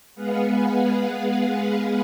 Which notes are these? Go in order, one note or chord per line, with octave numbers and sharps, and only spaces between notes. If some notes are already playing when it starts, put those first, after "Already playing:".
G#3 B3 G#4 B4 F5 F#5